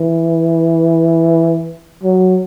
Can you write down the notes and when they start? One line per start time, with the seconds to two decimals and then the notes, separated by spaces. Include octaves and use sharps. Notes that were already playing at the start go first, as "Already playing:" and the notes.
Already playing: E3
2.03 F#3